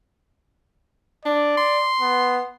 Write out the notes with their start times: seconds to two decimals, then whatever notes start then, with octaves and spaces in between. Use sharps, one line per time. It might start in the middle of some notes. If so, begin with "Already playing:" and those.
1.25 D4 D5
1.58 C6
2.00 B3